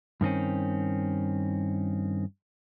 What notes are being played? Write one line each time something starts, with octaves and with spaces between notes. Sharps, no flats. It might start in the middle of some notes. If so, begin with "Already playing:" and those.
G2 D#3 C4 C#4